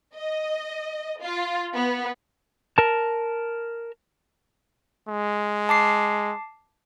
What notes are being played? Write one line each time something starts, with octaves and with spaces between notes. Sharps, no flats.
D#5
F4
B3
A#4 A5
G#3
A5 D6 C7